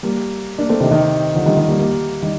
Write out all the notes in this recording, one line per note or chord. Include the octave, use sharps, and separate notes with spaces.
G3 A#3
A#3 D4
A3 C4
C3 D#3
C3 D#3
D3 F3
D#3 G3
D#3 G3
G3 A#3
G3 A#3
D#3 G3